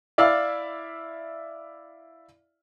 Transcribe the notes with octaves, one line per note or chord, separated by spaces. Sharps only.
E4 D5 E5 F5